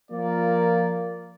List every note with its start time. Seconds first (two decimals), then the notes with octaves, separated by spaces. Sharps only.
0.11 F3 A#3 F4 A#4 D5